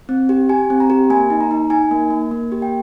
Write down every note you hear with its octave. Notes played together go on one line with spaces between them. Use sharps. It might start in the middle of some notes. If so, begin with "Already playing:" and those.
C4
G4
G4 G#5
C4
A#5
G4
A#3 G#5
D#4
A#5
D#4
D#4 G#5
A#3
A#3
A#3
G4
G5